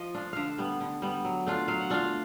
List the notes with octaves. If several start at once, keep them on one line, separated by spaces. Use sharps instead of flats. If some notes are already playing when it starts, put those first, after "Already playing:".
Already playing: F3 D#5
A3 D4 F4
D3 E5 F5
G3 B3
D3
G3 B3
F#3
A3 D4 F4
F#3 F5
F#5
A3 D4 F4 F5